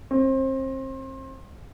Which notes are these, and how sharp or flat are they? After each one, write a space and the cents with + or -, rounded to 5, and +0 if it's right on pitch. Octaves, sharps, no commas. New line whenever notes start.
C4 +30